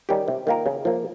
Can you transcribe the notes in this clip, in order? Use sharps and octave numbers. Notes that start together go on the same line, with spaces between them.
D#3 G3 C#4 G4
C3
D#3 A#3 F4 A#4
C#3
F3 A#3